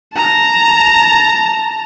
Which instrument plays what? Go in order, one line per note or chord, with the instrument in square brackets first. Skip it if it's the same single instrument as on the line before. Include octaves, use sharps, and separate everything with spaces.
[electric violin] A5 A#5